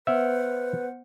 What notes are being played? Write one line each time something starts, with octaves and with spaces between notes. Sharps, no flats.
B3 B4 C5 E5 F#5